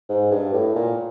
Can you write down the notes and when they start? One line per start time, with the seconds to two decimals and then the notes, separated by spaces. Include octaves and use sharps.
0.09 G#2
0.31 G2
0.54 A2
0.76 A#2